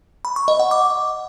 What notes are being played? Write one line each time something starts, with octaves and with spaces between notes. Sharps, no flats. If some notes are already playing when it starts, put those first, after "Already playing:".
B5
C#6
D#5
F#5
D6